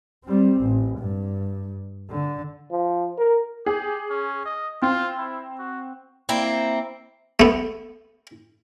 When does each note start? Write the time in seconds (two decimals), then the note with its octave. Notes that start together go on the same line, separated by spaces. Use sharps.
0.25 G3 C4
0.62 A1
0.99 G2
2.10 D3
2.71 F3
3.18 A#4
3.66 G4 G#4
4.10 C#4
4.46 D#5
4.82 C4 F4
5.18 E4
5.59 F#4
6.29 A#3 C4 E4
7.40 A3 B3